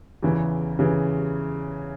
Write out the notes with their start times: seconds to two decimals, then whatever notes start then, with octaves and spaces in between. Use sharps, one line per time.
0.23 E2 C#3 E3
0.79 C#3 E3